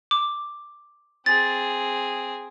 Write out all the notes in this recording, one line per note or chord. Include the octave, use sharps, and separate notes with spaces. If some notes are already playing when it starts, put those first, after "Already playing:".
D6
C4 G#4 A6